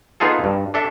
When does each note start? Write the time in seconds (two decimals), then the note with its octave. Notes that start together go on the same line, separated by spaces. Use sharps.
0.20 B3 D#4 F4 G#4 A4
0.44 G2
0.74 D4 A4 E5